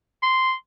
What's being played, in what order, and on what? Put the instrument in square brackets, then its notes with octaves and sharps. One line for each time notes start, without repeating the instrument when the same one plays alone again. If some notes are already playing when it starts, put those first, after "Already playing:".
[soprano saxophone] C6